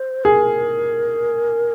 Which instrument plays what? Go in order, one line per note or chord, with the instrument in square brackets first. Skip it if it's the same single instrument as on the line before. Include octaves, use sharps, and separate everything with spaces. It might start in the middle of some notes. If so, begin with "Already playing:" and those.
Already playing: [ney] C5
[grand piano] G#4 [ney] A#4